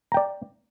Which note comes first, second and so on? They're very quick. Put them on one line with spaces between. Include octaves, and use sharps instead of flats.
A#5 G5 D5